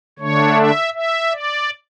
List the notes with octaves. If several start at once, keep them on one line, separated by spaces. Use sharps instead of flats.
D3 A3 D4 C#5
E5
E5
D5